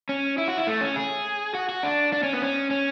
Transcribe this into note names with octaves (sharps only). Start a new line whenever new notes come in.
C#4
E4
F#4
E4
A3
C#4
G#4
F#4
F#4
D4
D4
C#4
B3
C#4
C#4